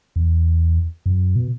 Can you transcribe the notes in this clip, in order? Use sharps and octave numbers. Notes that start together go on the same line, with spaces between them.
E2
F#2
B2